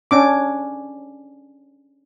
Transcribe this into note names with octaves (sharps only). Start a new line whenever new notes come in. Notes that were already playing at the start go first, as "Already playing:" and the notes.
C#4 D4 D6